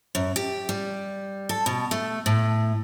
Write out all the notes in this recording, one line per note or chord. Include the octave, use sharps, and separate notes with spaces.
F#2
G4
G3
A4
B2
A3
A2